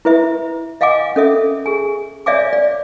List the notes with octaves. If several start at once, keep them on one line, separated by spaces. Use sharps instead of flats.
E4 B4 E5
D#5 F5 F#5 G#5 D6
C#4 A4 E5
G#4 G#5
C#5 D5 E5 F5 G#5 D6
D5